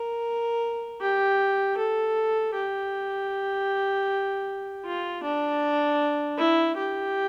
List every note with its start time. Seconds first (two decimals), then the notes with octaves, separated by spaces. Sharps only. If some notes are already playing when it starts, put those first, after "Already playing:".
Already playing: A#4
1.01 G4
1.77 A4
2.55 G4
4.85 F4
5.23 D4
6.38 E4
6.77 G4